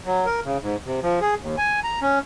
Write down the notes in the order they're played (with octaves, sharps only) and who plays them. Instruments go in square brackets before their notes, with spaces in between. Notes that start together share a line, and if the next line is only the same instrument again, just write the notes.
[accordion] F#3
A#4
C#3
G#2
C3
F3
G#4
D#2
G#5
A#5
C#4